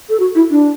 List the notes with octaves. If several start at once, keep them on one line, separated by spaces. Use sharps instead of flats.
A4
F#4
E4
D4